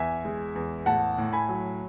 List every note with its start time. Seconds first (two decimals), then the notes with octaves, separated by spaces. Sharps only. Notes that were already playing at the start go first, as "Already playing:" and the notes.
Already playing: E2 E5 G#5
0.25 G#3
0.55 E2
0.86 A2 F#5 A5
1.18 A2
1.33 G#5 B5
1.49 F#3